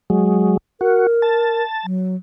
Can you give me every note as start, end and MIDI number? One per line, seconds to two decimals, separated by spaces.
0.10 0.57 54
0.10 0.57 56
0.81 1.07 66
0.81 1.62 70
1.22 1.86 81
1.84 2.16 54